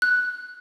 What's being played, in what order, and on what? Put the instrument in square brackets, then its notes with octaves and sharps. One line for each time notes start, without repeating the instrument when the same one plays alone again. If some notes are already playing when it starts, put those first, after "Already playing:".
[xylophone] F#6